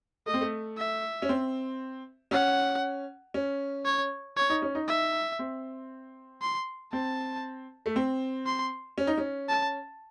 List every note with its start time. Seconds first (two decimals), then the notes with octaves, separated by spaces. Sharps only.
0.26 A3 D#5
0.34 C4
0.41 A3
0.78 E5
1.22 C#4
1.29 C4
2.31 C#4 F#5
3.34 C#4
3.85 C#5
4.37 C#5
4.50 D#4
4.62 C#4
4.75 D#4
4.88 E5
5.39 C4
6.42 C6
6.92 C4 A5
7.86 A3
7.96 C4
8.46 C6
8.98 C#4
9.07 D#4
9.18 C#4
9.49 A5